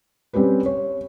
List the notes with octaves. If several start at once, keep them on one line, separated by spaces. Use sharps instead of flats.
G3 C4 C#4 G4 B4
C#5